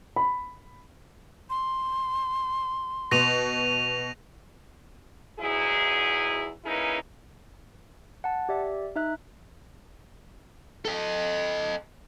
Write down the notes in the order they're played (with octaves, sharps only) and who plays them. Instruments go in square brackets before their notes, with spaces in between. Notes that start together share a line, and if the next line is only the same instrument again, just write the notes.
[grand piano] B5
[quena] C6
[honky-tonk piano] B2 [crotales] A#6 D#7 F7
[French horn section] E2 G#2 F#3 E4 G#4
A#3 C#4 D#4 E4 G#4 B4
[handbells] F#5 A5
G4 D5 E5
D#4 E5 F#6
[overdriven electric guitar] A4 D#5